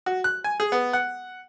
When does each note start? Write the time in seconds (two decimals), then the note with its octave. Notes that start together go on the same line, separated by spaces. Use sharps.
0.06 F#4
0.24 F#6
0.44 G#5
0.60 G#4
0.72 B3
0.93 F#5